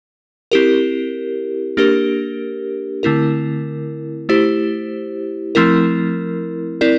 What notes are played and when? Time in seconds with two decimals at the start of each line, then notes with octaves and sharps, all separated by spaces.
0.52 C4 E4 G4 A#4
1.77 A#3 D4 G4 A#4
3.03 D3 A3 C4 E4 A#4
4.29 A3 E4 G4 C5
5.55 F3 A3 C4 E4 A#4
6.81 C4 E4 A#4 D5